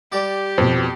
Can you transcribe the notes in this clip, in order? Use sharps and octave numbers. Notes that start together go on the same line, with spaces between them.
G3 G4 D5
F2 B2 C5